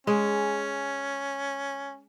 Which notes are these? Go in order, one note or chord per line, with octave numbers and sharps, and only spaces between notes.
G#3 C#4